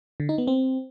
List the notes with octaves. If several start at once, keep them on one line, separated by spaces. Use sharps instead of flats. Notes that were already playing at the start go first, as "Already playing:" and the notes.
D3
D#4
B3
C4